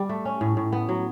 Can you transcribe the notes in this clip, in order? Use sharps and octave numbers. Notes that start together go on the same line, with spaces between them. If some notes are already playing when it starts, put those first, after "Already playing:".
Already playing: G3
A3
C#4
A2
A2
B3
F#3